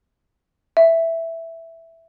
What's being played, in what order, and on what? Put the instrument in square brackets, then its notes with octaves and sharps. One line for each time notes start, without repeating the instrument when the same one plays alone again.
[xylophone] E5